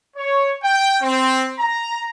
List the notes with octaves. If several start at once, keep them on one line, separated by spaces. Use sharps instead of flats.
C#5
G5
C4
A#5